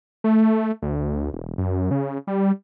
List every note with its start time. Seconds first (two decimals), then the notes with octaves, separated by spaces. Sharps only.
0.24 A3
0.82 D2
1.34 E1
1.58 F#2
1.91 C#3
2.27 G3